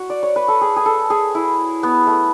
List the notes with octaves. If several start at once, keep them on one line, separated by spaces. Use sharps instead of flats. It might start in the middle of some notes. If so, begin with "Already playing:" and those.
Already playing: F#4
D5
C#5
B4
A4
G#4
G#4
A4
G#4
E4
B3
A3